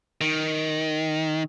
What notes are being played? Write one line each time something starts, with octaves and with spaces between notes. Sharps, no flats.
D#3